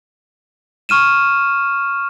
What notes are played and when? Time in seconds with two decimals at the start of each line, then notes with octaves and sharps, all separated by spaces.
0.89 C#6 F6 D#7 E7